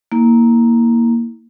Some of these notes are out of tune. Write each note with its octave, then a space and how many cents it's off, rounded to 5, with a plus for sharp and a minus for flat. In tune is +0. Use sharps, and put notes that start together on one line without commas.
A#3 +0 E4 -35